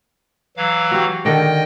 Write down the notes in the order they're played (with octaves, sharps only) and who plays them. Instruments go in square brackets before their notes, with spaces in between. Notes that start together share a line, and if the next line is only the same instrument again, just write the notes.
[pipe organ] E3 F#3 F5
[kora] F#4 G4
[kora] D3 D#3 D4 [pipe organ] D#5 G5